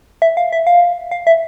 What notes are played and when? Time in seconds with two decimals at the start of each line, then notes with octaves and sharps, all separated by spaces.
0.22 E5
0.37 F5
0.53 E5
0.67 F5
1.11 F5
1.27 E5